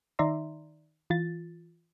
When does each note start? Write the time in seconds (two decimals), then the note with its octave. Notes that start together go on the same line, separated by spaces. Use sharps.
0.19 D#3 D#4 D5 E5 A#5 C6
1.10 E3 F4 A6